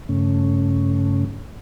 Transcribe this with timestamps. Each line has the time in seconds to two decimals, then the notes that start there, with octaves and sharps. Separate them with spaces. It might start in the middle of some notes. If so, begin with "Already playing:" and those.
0.09 G2 C#3 A3 C#4